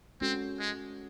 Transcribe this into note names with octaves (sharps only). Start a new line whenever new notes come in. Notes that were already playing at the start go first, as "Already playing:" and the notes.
G#3 C4 C#4 F#4 A4
G#3